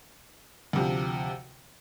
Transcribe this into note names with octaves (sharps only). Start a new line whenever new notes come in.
D2 C3 F3